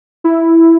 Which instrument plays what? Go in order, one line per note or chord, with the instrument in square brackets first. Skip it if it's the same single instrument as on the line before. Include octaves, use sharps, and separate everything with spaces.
[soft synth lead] E4